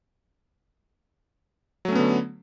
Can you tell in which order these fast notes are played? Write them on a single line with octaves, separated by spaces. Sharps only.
F#3 A3 C#4 B3 D3